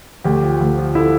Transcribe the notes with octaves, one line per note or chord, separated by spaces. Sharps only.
D2 G4
F3
D2
F3
D3 E4